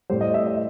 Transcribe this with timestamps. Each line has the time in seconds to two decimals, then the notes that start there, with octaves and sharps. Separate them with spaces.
0.10 A2 G3 C5
0.21 D#5
0.34 E5
0.47 D#5